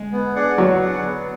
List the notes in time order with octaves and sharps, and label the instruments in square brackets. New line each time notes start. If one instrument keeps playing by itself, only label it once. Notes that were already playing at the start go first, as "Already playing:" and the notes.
Already playing: [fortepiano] G#3
[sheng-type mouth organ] B3
D4 G#4 D5 F#5
[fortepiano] F#3 [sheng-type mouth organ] B3
[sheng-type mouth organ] D4 G#4 D5 F#5
B3